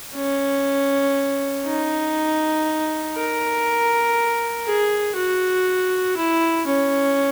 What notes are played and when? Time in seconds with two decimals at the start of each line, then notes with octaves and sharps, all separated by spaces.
0.15 C#4
1.65 D#4
3.16 A#4
4.67 G#4
5.16 F#4
6.17 E4
6.67 C#4